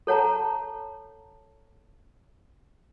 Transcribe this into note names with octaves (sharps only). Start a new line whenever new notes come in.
A4 C#5 F#5 A5 A#5